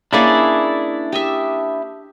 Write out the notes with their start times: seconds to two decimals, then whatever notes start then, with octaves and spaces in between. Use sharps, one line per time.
0.13 A#3 C#4 D4 E4 G#4 D5
1.12 G4 D#5 E5